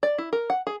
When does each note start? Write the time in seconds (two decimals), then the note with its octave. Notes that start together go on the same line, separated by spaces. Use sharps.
0.03 D5
0.18 E4
0.33 A#4
0.50 F#5
0.67 G#4